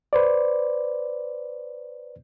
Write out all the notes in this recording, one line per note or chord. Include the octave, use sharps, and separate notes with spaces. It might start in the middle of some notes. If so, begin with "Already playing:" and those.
B4 C5 D5